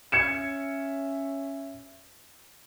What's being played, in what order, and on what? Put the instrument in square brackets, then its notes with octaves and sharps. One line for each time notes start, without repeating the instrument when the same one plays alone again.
[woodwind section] C#4 C#5 E5 [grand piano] G#6 C#7 E7